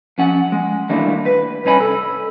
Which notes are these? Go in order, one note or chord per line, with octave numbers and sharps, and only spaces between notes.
F3 C#4 F#5
G#3
D#3 G3 A3 A#3 D4 E4
B4
C2 G2 C#4 D#4 G#5 B5
A4